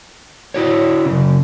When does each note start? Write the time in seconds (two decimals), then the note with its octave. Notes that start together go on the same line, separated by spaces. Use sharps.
0.54 E4 F#4 C#5
1.06 F#2 C#3